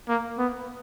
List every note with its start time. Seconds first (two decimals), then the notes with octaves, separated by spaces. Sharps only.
0.08 A#3
0.38 B3